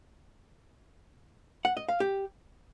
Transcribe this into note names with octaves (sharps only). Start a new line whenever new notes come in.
F#5
D#5
F5
G4